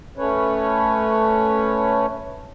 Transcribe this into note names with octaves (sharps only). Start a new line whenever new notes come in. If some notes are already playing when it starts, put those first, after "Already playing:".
A3 C#4 B4 C#5